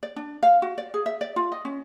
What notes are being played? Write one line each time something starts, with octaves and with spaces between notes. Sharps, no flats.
D5
D4
F5
F#4
D5
G#4
E5
D5
F4
D#5
C#4